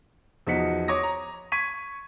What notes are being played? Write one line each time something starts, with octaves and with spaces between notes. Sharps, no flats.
E2 F3 D#4 F#4 B6 C#7
C#5 D6 D#6 A#6
A#5
C#6 G#6 B6 D#7